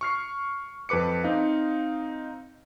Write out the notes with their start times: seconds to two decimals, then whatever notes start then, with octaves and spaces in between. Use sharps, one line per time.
0.01 C#6 F6 C7
0.89 F2 A4 B4 D6 C#7
1.24 C4 D#4 F5